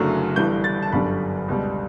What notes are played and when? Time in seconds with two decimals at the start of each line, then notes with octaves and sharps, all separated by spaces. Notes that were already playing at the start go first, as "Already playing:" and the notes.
Already playing: F#1 F#2 D3 F#3 A3
0.36 G1 G2 E3 G3 G6
0.64 A6
0.82 A5
0.92 G1 F#2 D3 G3 B5
1.48 C#2 B2 G3